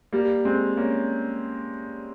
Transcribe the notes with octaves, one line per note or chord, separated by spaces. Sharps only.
G3 A#3
G#3 C4
A#3 C#4